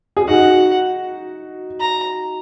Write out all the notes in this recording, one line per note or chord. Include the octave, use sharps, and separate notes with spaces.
G#4
D#4 F#4 F#5
A#5